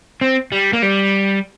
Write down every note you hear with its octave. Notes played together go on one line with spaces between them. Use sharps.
C4
G3
A#3
G3